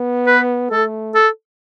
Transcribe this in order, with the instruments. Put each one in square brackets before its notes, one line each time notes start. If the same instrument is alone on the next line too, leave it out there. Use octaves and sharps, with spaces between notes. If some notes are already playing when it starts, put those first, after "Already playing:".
Already playing: [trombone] B3
[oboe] B4
[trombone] A3 [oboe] A4
[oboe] A4